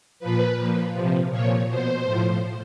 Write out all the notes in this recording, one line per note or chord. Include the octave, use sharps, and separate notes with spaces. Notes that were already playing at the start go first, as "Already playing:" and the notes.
A#2 F3 B4
A#2 F3
C3 F3
A#2 F3 C#5
B2 C5
A2 F3